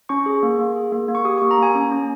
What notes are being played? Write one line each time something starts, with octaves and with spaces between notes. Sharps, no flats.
C#4 C#6
G#4
A#3
A#3
G#4
A#3
A#3
C#6
G4 D#6
C#6
A#3
A#5
A#3 G#5
C#4
C#4